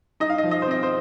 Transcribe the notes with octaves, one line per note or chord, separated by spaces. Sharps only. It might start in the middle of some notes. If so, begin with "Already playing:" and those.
D#4 D#5
F5
D#5
F3
D#5
C5
C4 D#5
C5